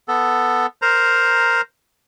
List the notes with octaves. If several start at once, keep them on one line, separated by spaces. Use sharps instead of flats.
B3 A4
A#4 C5 A#5